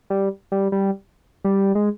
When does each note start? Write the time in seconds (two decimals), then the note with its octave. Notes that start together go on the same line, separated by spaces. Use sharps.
0.10 G3
0.52 G3
0.72 G3
1.44 G3
1.75 G#3